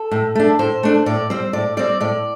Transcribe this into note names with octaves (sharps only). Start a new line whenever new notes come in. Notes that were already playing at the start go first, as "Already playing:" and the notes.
Already playing: A4
A2
A3 D4
A2 C5
A3 D4
A2 D5
G3 C4 C5
A2 D5
G3 C4 D5
A2 D5